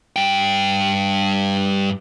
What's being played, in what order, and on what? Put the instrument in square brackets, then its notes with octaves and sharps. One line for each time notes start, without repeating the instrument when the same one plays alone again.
[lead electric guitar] G2 G5